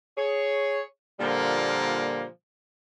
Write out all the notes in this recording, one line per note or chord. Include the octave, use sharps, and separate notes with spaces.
G#4 C#5
A#2 D3 F3 G3 A#3